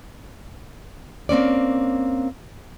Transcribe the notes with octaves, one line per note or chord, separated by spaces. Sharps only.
A#3 C4 C#4 D5